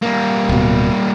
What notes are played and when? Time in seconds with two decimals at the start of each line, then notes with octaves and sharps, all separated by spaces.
0.02 G3 A#3
0.49 D1 B2